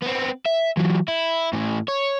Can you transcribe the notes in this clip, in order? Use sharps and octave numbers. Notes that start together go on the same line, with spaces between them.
B3 C4
E5
E3 F#3
E4
A2 E3
C#5